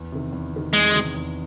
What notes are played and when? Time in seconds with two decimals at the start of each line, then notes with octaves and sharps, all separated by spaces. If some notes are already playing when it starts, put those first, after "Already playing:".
Already playing: E2
0.12 C3 D#3
0.33 E2
0.53 C3 D#3
0.73 E2 G#3
0.94 C3 D#3
1.15 E2